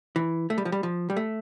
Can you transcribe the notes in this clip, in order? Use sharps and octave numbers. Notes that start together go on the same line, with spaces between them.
E3
A3
G3
F3
G3
F3
G3
A3